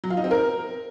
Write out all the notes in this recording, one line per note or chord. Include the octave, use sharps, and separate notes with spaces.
F#3
F4
D#4
C4
A#4